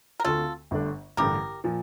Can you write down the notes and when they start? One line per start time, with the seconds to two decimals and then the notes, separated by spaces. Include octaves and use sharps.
0.20 A#4
0.24 D2 D3 A3 C4 F4 A4
0.71 G1 G2 D3 A3 D4
1.17 A1 G2 D3 G4 A#4
1.64 A#2 F3